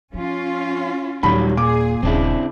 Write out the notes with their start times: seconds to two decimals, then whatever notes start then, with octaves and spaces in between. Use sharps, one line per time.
0.14 F3 C#4 F4
1.23 D#1 D#3 F#3 G3 B5
1.57 A#2 G#4 D6
2.03 D#1 C#3 C4 D4 E4